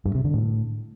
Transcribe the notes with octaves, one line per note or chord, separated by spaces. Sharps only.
G2
C3
D3
A2